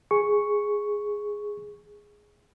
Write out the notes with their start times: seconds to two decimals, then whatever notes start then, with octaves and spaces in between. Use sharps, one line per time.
0.11 G#4 C#6